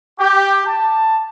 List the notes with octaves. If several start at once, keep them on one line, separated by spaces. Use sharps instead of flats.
G4
A5